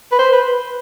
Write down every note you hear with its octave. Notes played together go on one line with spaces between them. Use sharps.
B4
C5
B4